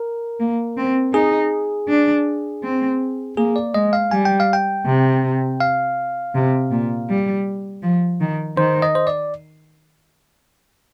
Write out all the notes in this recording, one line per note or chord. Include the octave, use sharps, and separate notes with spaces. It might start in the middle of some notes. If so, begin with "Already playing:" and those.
Already playing: A#4
A#3
C4
D#4 G#4
D4
C4
A#3 G#4
D5
G#3 D#5
F5
G3 G#5
G5
F5
G5
C3
F5
C3
A#2
G3
F3
D#3
D#3 C5
D#5
C5
D5